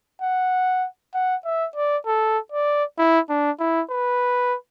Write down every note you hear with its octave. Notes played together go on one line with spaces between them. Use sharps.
F#5
F#5
E5
D5
A4
D5
E4
D4
E4
B4